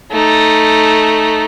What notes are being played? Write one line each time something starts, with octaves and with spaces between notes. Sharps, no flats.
A3 D#4